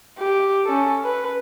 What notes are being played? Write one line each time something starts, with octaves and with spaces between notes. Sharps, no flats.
G4
C#4 A4
B4